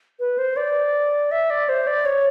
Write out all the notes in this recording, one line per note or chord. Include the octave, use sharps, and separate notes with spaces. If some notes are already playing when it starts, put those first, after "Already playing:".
B4
C5
D5
E5
D5
C5
D5
C#5